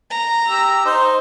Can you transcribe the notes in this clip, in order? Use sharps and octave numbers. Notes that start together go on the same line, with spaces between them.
A#5
G4 E6
D#4 C5